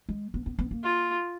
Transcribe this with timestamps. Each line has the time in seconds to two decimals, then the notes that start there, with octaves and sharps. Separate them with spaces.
0.09 G#3
0.34 B3
0.46 B3
0.59 B3
0.71 A#3
0.83 F4